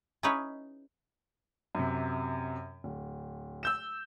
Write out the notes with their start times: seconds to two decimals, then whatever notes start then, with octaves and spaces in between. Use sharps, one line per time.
0.23 C#4 D#4 E4 G#4 B4 C#5
1.75 F#2 C3
2.84 D1
3.63 E6 G6 E7